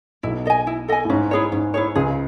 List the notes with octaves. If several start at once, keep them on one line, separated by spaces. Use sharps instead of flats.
B1 B2 E4
A4 D#5 G#5
E4
A4 D#5 G#5
A2
G#2 C#4
E4 G#4 C#5
G#2 C#4
E4 G#4 C#5
C#2 C#3 G#4